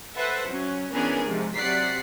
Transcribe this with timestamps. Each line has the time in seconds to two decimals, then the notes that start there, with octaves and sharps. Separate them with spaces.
0.16 A4 B4 C5 E5 F#5
0.48 F#3 C#4
0.93 E3 B3 C#4 D4 G#4 A#4
1.26 G#2 C3 F3
1.56 C3 F#3 D5 F#5 B6 C7